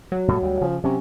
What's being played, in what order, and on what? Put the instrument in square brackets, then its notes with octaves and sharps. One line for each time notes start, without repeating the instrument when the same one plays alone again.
[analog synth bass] F#3
[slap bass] A2 G3
D2 G3
[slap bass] C#3 [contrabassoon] F3
[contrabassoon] C3 [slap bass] F#3 C#4